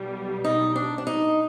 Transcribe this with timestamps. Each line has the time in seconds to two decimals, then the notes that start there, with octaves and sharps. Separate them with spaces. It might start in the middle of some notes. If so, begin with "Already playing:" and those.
Already playing: B1 B2 G3
0.44 D#4
0.76 D4
0.98 D4
1.07 D#4